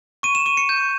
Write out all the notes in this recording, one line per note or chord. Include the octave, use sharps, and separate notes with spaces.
C#6 D#7
E7
C#6 D#7
C#7
G6